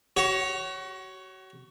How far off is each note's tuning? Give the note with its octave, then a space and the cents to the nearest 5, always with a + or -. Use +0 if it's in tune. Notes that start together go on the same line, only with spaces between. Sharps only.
F#4 +35 C#5 +0